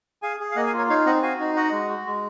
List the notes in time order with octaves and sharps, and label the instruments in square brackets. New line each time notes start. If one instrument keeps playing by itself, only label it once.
[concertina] G#4 F5 G#5
G#4
F5
A#3 D#5 F#5
F5 G#5
F4 A#4 C#5
D#4 C#5 F5
C4 D#5 F#5
F#4 F5 G#5
D#4
F#4 D#5 F#5
G#3
F#4
G#3